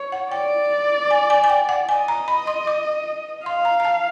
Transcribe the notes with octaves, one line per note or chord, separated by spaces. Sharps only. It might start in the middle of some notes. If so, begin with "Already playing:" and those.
Already playing: C#5
F#5
D5 G5
G#5
G#5
G#5
G5
F#5
D#5 G#5
A#5
B5
C6
D6
F5 C6
A#5
A#5
A5